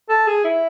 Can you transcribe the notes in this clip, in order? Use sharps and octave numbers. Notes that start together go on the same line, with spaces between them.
A4
G#4
E4